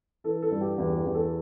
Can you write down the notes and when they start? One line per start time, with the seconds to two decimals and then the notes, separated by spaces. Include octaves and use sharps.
0.24 E3 A4
0.42 A4
0.51 G2
0.61 G4
0.78 E2 G4
0.97 G4
1.06 E2
1.15 A4